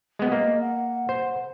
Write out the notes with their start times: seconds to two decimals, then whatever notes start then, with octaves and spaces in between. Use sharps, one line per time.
0.19 G#3 B3
0.32 A#3 D#5
0.61 F#5
1.09 C5